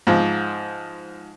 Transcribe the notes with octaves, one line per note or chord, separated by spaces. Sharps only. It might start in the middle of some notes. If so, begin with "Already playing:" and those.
G#2 F3